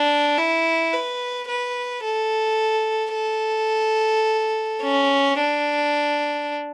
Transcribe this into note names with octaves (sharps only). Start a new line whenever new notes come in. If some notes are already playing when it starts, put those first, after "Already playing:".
Already playing: D4
E4
B4
B4
A4
A4
C#4
D4